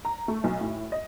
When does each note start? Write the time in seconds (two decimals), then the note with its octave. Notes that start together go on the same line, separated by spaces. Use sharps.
0.05 A#5
0.28 A3
0.44 B1
0.61 A2
0.92 D#5